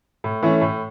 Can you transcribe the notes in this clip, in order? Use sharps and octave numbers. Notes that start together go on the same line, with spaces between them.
A2
E3 A3 C#4 E4
A2